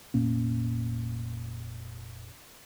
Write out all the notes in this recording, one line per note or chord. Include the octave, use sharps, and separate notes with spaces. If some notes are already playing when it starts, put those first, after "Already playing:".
F1 A#2 A#3 C#4